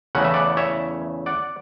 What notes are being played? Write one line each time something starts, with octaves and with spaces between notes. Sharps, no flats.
E2 C#3 E3 A3 C#4 F#5
E5
D5 F#5
C#5 E5
D5 F#5